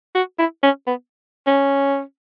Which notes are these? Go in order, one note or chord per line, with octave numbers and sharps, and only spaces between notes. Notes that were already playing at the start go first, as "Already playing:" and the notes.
F#4
E4
C#4
B3
C#4